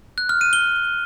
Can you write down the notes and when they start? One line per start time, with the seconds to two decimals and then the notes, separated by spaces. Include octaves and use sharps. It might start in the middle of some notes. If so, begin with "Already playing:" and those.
0.18 F#6
0.29 F6
0.41 D#7
0.53 G7